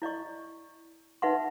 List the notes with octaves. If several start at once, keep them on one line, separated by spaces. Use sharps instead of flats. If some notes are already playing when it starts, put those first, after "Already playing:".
E4 D5 D#5 C#6
D#4 B4 E5 F#5 C6